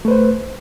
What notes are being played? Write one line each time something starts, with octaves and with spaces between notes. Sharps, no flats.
A3 B4 C5